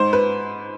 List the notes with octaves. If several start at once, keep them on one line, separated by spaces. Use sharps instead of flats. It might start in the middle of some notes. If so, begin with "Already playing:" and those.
Already playing: G#2 C5
B4